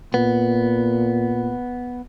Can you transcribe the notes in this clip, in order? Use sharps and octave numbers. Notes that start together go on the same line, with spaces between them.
A#2 B3